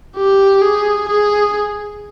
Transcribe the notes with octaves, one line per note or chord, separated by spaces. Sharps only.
G4
G#4
G#4